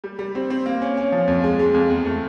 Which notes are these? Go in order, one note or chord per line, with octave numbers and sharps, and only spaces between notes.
G3
G3
C4
C4
A#3
C#4
C#4
F3
F2
G#3
G#3
F2
E2
A3